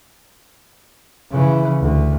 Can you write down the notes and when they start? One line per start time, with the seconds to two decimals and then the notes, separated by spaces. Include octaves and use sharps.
1.32 C#3 E3
1.81 D2